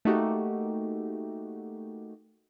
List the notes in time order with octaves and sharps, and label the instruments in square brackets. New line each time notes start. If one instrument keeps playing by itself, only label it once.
[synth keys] A3 A#3 D#4 F#4 G4